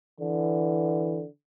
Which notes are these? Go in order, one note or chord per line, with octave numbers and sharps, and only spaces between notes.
D3 E3